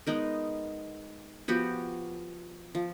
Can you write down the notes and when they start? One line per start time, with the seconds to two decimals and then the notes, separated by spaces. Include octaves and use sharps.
0.07 G#3 B3 D#4 A#4
1.48 F3 B3 F#4 G4
2.75 F3